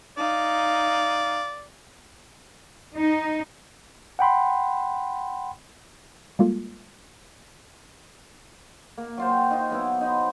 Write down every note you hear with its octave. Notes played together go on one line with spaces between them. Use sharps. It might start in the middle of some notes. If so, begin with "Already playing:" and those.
D#4 D5 F5
D#4
F#5 G5 B5 C6
G3 G#3 A#3 F4 F#4 A4
A#3
F#3 F4 C5
G5
D#4 F4
F#3 B3 E4
D#4 C5 B5